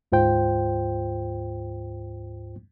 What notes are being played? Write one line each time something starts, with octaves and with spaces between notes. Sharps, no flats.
D2 G#2 F4 C5 G5